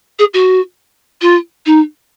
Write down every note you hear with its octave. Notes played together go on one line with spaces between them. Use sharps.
G#4
F#4
F4
D#4